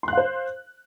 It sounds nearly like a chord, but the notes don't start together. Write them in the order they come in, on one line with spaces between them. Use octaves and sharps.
C6 F#6 F5 C5